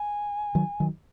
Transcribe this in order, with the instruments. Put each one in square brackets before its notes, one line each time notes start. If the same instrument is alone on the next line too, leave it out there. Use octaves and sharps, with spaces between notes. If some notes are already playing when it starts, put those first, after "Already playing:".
Already playing: [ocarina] G#5
[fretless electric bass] D#3 F#3
D#3 F#3